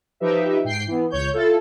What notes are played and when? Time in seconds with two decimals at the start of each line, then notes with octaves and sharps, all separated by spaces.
0.20 F3 D#4 G4 B4 E5
0.64 G#2 G5 C7
0.87 E3 B3
1.10 C#2 C#5 G6
1.34 E4 F4 A4